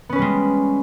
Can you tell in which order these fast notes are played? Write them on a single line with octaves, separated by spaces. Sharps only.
B3 C#4 B4 G3 G#3